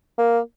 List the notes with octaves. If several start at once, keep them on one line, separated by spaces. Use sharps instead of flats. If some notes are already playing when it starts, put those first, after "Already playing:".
A#3